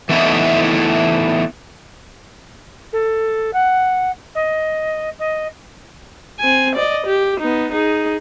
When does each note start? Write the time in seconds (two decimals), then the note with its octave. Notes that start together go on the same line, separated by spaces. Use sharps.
0.09 E3 A3 B3 D#4 E4
2.92 A4
3.53 F#5
4.35 D#5
5.19 D#5
6.40 C4 G#5
6.75 D5 D#5
7.06 G4
7.40 B3 D#4
7.71 D#4 G#4